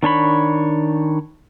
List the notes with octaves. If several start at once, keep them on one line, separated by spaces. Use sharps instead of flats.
D#3 D4 C#5 B5